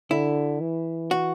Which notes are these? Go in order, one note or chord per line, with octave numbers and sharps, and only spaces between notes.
D3 E4
E3
F#4